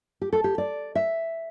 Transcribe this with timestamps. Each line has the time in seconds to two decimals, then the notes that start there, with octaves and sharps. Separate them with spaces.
0.21 G4
0.33 A4
0.44 G4
0.58 D5
0.95 E5